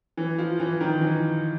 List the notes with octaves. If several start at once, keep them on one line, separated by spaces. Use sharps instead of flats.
E3
F3
E3
D#3
E3